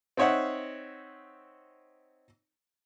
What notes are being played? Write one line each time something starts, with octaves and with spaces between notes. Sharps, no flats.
C4 D#4 C#5 E5 F#5